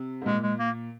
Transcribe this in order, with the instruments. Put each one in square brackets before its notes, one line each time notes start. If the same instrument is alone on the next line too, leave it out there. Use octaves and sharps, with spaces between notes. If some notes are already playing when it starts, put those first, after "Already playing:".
Already playing: [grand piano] C3
G#2
[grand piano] A#2 [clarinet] G#3
[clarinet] G#3
A#3